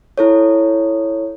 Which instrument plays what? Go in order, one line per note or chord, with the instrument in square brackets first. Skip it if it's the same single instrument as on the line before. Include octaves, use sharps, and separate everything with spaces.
[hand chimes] E4 A4 C#5